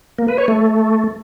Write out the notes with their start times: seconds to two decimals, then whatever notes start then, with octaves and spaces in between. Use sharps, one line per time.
0.18 A#3
0.28 B4
0.38 C#5
0.48 A3